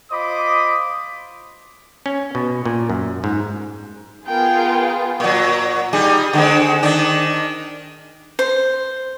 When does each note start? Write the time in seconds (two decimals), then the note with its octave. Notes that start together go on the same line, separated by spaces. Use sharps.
0.11 F4 C5 D#5 B5 D6 D#6
2.06 C#4
2.35 B2
2.66 A#2
2.90 F#2
3.24 G#2
4.27 B3 F4 G#4 A#4 G5
5.20 A#2 F#3
5.93 G3 D#4 G#4
6.33 D3 G#3 C4
6.83 D#3 D4
8.39 C5